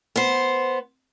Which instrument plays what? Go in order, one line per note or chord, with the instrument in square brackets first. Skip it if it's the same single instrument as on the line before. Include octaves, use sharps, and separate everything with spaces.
[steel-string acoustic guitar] B3 C5